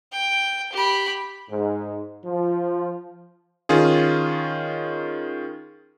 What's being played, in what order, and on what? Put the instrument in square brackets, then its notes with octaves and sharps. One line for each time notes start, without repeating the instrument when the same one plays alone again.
[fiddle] G5
G4 B5
[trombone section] G#2
F3
[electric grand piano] D#3 C#4 F4 G#4